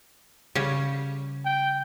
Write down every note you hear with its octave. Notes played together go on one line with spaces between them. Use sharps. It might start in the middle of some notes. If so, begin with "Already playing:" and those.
C#3 G3 C#4
G5